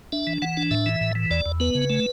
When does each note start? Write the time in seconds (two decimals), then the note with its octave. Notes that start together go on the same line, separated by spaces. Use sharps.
0.12 D4 E5
0.27 E3
0.42 E3 F#5
0.57 D4
0.71 A2 E5
0.86 E3
1.01 A2
1.15 E3
1.30 E2 D5
1.46 E2
1.60 B3 B4
1.75 C#3
1.90 A3